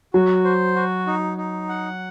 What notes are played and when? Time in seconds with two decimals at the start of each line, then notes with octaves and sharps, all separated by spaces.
0.14 F#3 F#4
0.44 C5
0.76 F#4
1.07 D#4
1.38 D#4
1.69 F#5